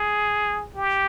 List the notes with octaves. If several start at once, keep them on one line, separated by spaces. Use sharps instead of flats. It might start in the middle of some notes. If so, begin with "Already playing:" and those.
Already playing: G#4
G4